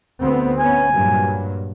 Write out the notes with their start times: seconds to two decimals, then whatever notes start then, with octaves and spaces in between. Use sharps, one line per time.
0.21 D2 B3 C4
0.59 B3 C#4 G#5
0.94 G2 A#2 F#3